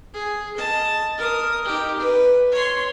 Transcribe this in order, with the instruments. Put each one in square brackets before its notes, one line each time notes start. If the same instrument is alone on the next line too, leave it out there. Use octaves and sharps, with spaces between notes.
[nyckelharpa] G#4
D#5 A5
A#4 D#6
D#4 G4
B4
C#5 C6